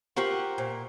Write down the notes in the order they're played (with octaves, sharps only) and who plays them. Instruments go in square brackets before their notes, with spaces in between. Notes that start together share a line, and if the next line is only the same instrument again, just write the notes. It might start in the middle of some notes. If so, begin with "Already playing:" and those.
[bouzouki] F4 A#4 C5 [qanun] G4 F#5 C#6
[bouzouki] A#2